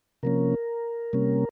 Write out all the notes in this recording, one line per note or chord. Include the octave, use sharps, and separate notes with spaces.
C3 F3 A#3 C#4 A#4
C3 G3 A#3 C#4